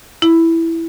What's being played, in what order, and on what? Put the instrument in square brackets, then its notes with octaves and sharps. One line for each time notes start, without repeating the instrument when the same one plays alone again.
[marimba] E4